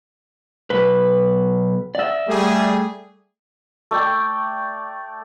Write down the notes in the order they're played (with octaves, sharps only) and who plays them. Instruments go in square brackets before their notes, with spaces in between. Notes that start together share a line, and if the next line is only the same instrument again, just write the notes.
[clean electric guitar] B1 B4
D5 E5
[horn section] G3 A3 G#4
[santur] A3 D5 G5